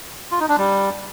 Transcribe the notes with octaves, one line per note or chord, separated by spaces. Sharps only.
F4
D#4
D4
G3